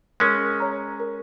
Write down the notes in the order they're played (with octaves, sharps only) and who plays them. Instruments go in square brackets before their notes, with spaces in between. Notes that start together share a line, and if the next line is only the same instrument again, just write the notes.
[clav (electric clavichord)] G#3 C#4 [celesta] A#4
[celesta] C#5 A#5
A#4